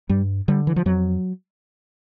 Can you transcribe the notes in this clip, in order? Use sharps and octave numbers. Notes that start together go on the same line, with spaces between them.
G2 G3
D3 G3
E3
F3
F2 F#3